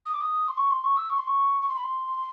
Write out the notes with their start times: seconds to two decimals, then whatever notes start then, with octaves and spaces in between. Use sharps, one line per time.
0.06 D#6
0.14 D6
0.21 D#6
0.48 C6
0.57 C#6
0.71 C6
0.84 C#6
0.97 E6
1.10 C#6
1.18 C6
1.27 C#6
1.61 C#6
1.69 C6
1.76 B5
1.84 C6